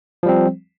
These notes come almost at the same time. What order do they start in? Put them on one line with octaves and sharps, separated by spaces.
F3 G3 C4